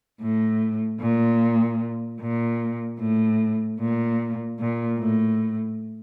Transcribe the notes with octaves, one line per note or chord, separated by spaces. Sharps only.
A2
A#2
A#2
A2
A#2
A#2
A2